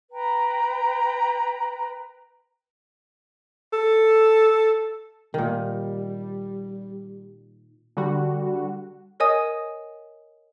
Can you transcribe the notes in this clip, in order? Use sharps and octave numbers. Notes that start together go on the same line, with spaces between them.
B4 G5 A#5
A4
A#2 D#3 G3
D3 G3 F#4
A#4 C#5 D#5 G#5 D#6